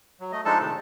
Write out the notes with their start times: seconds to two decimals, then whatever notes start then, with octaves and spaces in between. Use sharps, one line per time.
0.20 F#3
0.32 A3 D#5
0.45 F3 G#3 D4 D#4 A4 A5
0.59 A2 C3 D#3